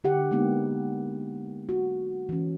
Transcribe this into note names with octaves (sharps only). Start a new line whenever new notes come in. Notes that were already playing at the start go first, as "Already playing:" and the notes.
D3 G4 F#5
G#3 A#3 B3 D#4
F#4
E3 C#4